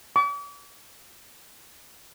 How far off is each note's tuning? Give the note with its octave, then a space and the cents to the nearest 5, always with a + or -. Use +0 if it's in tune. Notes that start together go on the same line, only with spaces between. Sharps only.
D6 -45